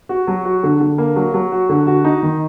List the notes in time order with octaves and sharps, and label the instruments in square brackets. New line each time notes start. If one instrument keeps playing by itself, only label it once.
[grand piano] F#4
F#3
F#4
D3
D3
A#3
F#3
F#3
F#4
D3
F#4
D#4
D#3